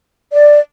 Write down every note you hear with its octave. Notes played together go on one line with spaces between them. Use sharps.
D5